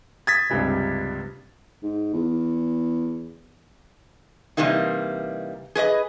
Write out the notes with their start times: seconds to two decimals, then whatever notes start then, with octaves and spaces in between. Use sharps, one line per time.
0.27 D#6 G#6 A6 B6
0.50 C#2 G2 C3
1.83 G#2
2.13 E2
4.57 C3 E3 G3 A#3 D#4
5.75 G#4 B4 D5 D#5